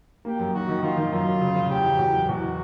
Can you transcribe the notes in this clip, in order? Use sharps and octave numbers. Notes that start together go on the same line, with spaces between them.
A#3 G4
F#2
D#3 F#4
D#3
D#3 F4
D#3
F#2 F4
F#2
C#3
C#3
E2 G4
F#3
E2
F#3
E2 F#4